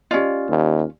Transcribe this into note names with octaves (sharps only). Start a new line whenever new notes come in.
C#4 F4 G4 D5 D#5
D#2